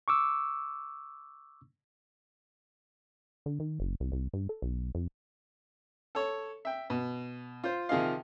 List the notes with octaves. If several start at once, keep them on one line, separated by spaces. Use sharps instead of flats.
C#6 D6 E6
D3
D#3
F#1
C2
C2
G2
A4
B1
F2
A4 C#5
E5 G5
B2
F4 C5
C3 D#3 F3 G#4 D#5 F5